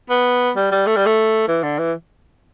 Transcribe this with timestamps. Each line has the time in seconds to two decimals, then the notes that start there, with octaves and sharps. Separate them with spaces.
0.10 B3
0.56 G3
0.71 G3
0.86 A3
0.96 G3
1.06 A3
1.48 E3
1.63 D3
1.78 E3